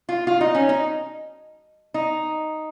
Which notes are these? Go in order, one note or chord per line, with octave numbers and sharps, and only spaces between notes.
F4
F4
D#4
C#4
D#4
D#4